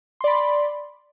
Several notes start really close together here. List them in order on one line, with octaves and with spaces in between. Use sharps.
C6 D5 B5